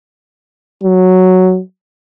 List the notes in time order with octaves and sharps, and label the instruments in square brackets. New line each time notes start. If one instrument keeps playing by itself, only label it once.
[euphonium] F#3